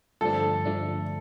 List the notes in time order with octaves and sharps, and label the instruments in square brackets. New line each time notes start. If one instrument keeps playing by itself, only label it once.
[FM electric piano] G2 D3 F3 A3 D4 [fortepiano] A4
[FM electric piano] G2 D3 F3 A3 D4